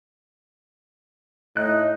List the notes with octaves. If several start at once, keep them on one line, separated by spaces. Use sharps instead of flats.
A2 D#4 D#5 F#6